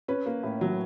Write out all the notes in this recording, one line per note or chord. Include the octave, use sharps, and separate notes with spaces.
C#4 B4
A#3
A2
F#3